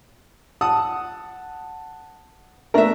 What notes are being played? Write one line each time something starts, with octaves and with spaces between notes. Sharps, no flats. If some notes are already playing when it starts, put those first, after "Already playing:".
F#5 A5 D#6
A3 B3 D4 A#4 E5